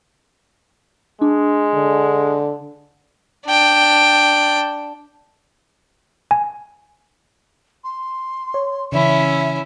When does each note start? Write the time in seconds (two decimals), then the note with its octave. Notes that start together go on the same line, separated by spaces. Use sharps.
1.22 G#3 D4
1.74 D3
3.46 D4 G5
6.31 G#5
7.84 C6
8.54 C#5
8.92 C#3 E3 C#4 E4 E5